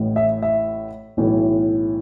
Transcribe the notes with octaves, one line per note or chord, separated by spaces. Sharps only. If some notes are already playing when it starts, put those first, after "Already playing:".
Already playing: A1 A2 E3
E5
E5
B1 A2 E3